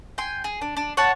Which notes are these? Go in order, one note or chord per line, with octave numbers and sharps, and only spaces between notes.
G5 G#5 C6
G#4
D4
D4
C#5 F#5 A5